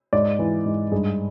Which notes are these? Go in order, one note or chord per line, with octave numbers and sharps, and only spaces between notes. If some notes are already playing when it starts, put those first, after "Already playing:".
G#2 D5
E3
G#2
G2 G#4